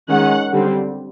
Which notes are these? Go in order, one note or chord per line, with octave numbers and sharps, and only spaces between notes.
D#3 G#3 C#4 F#5
D3 G3 C4